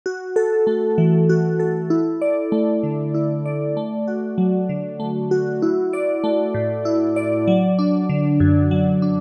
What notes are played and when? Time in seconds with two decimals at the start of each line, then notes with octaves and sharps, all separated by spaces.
0.06 F#4
0.36 A4
0.67 A3
0.98 E3
1.29 F#4
1.59 A4
1.90 E4
2.21 D5
2.52 A3
2.83 D3
3.14 E4
3.46 D5
3.77 A3
4.07 F#4
4.38 F#3
4.69 D3
5.00 A3
5.31 F#4
5.62 E4
5.93 D5
6.24 A3
6.54 A2
6.85 E4
7.16 D5
7.48 F#3
7.79 D4
8.09 D3
8.40 F#2
8.71 F#3
9.02 D4